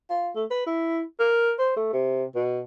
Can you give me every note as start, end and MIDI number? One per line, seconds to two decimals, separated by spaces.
0.10 0.30 65
0.35 0.45 57
0.51 0.66 71
0.66 1.02 64
1.19 1.52 70
1.59 1.71 72
1.76 1.89 57
1.93 2.24 48
2.35 2.63 47